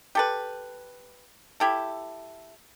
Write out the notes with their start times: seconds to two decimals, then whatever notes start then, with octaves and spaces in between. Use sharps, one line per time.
0.15 G4 A4 B4
1.60 E4 G4 A4